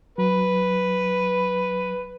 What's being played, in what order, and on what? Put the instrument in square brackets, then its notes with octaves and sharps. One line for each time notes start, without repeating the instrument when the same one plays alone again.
[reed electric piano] F#3 [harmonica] B4